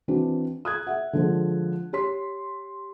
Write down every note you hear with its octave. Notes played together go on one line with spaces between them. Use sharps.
E3 C4 D4 F#4
D#6 F#6 G#6
E5 F#5
D3 F3 G#3
G4 C#5 C6 B6